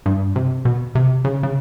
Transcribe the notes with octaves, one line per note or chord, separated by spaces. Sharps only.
G2
C3
B2
C3
C#3
C#3